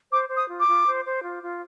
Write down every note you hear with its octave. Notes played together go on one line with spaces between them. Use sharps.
C5 D6
C5
D#6
F4
D6
F4
C5
C5
F4
F4